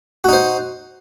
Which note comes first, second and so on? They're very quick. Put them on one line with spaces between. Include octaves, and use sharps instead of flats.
F#4 D#4 C5